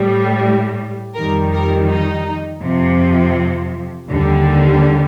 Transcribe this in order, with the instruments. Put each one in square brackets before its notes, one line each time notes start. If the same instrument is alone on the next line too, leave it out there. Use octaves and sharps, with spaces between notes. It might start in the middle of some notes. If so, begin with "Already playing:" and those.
Already playing: [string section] A2 G3
F2 D#3 G3 A#4
A#4
D#4
F2 C3 F3
D#2 D3 G3